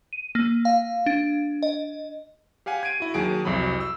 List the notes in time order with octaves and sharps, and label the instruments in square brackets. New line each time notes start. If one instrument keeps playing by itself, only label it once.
[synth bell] D#7
A#3
F5
D4
D#5
[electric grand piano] G4 F5 F#5 G#5
G#6 C7 D7 D#7
E4 F#4
D#2 F#3 G#4 D7
C2 F2 F#3 B5
E6